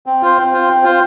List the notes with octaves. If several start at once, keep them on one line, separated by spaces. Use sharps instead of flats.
C4
F4 C5
C4
F4 C5
C4
F4 C5